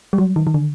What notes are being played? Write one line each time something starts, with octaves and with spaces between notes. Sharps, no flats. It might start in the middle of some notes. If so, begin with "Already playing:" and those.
G3
F#3
D#3
D#3
D3